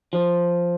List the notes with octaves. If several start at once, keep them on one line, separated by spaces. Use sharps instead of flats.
F3